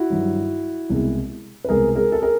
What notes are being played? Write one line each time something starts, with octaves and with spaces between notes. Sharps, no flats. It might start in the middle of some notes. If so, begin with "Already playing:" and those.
Already playing: E4 F#4
G2 D#3 F#3
C2 B2 G#3
B4
C2 B2 G#3 G#4 A#4
G#4 A#4
A4
G#4 A#4